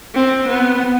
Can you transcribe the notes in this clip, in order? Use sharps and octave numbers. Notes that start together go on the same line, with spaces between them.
C4
B3